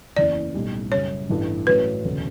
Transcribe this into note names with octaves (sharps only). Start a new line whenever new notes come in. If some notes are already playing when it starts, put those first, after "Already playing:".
F#1 E2 C#3 E3 D5
B1 A2 G3
F#2 C#3 G3 C#5
A1 G2 E3 A3 E4
A1 A2 F#3 C#4 F#4 B4
E1 D2 C#3 F#3